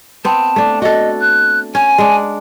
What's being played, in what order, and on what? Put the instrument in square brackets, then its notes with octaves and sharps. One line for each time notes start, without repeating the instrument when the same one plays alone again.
[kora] B3 C4 [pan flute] A5
[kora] A3 D4
[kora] F#4 A4 [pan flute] D#5
[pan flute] F#6
[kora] C#4 [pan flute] G#5
[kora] G#3 D4